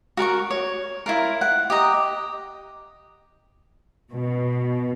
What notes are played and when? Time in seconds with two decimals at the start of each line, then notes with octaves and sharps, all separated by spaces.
0.17 F#4 A#4 A5 C#6
0.50 C#5
1.06 E4 F4 A#4
1.41 F#5
1.70 G4 D#5 A#5
4.12 B2